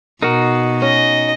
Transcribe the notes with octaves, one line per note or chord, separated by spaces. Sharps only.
B2 D#4 F#4 A#4
C#4 D#5